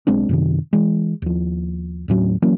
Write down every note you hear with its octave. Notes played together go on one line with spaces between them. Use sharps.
B1 G#3 C4 D4
F#2 C3 D#3
E3 G#3
D#2 F3
D#2 A2 F#3 C#4
E3 F#3 A#3 C#4